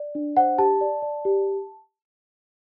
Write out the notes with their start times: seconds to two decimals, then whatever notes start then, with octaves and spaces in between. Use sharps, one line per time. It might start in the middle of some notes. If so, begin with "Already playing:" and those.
Already playing: D5
0.15 D4
0.37 C5 F#5
0.58 G4 A5
0.81 D5
1.02 D5
1.25 G4